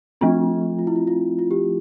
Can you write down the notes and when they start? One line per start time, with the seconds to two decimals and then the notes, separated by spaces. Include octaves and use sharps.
0.21 F3 A3 C4 F4
0.79 F4
0.87 E4
0.96 F4
1.07 F4
1.39 F4
1.51 G4